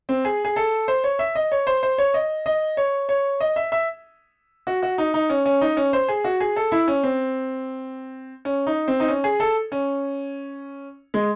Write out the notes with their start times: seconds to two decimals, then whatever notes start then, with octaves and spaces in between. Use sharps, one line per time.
0.09 C4
0.25 G#4
0.45 G#4
0.56 A4
0.88 C5
1.04 C#5
1.19 E5
1.35 D#5
1.52 C#5
1.67 C5
1.83 C5
1.98 C#5
2.14 D#5
2.46 D#5
2.77 C#5
3.09 C#5
3.40 D#5
3.56 E5
3.72 E5
4.67 F#4
4.83 F#4
4.98 D#4
5.14 D#4
5.30 C#4
5.45 C#4
5.61 D#4
5.77 C#4
5.93 C5
6.08 G#4
6.24 F#4
6.40 G#4
6.56 A4
6.72 E4
6.88 C#4
7.03 C4
8.45 C#4
8.67 D#4
8.88 C4
9.00 D#4
9.08 C#4
9.24 G#4
9.40 A4
9.72 C#4
11.14 G#3